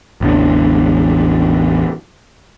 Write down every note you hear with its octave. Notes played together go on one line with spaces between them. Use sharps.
A1 E2 D3